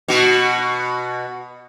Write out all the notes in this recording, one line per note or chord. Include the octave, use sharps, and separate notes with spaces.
B2 F#4